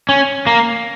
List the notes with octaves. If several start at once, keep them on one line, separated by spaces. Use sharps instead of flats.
C#4
A#3